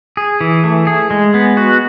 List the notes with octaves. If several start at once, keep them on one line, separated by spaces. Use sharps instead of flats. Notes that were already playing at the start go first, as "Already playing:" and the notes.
G#4
E3
A3
G#4
G#3
B3
F#4